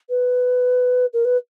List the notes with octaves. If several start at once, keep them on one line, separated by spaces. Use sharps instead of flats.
B4
A#4
B4